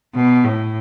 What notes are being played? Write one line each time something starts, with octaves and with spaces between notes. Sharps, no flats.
B2
A2